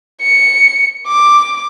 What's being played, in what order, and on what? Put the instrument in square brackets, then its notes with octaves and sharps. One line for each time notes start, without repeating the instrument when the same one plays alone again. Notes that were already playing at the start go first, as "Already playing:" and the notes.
[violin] C#7
D6